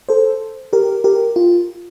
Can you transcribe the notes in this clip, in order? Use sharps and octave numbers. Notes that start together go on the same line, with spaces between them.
A4 C5
G4 A#4
G4 A#4
F4